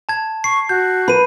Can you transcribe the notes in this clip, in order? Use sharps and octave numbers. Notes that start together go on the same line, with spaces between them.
A5 G#6
C#6 C7
F#4 G6
B4 B5 D#7